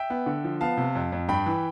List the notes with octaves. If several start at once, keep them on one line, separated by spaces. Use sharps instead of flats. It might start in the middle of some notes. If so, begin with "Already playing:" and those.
Already playing: E5 G5
B3
D3
F3
B3 F5 A5
C3
F2
F2
G2 G5 B5
E3